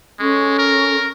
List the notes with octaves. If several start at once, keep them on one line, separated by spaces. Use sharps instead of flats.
G#3 C#4 A4 C#6
A#4